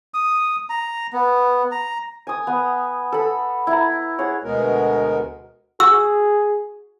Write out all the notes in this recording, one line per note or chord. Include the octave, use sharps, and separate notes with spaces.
D#6
A#5
B3
A#5
G#5 D#6
B3
A4 B5
E4 A#5
G#4 C#5 F#5
D2 B2 G#3 B3 F#4 A#4
F#4 G#4 E6